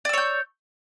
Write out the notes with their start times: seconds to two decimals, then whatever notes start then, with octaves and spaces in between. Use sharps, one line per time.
0.05 D5
0.09 E6
0.13 C#5
0.18 G6